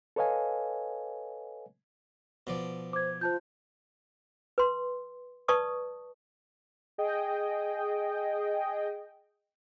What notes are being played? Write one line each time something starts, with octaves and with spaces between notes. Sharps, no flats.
A4 B4 C#5 D#5 F5 G#5
B2 F3 D5
C5 D6 G#6
F4 C5 A5 G6
B4 C6
B4 D5 A5 C#6 D#6
G#4 D#5 G5